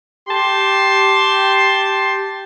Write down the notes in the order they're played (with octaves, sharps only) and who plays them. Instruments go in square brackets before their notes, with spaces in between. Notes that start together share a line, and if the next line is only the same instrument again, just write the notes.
[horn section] G4 A5 C6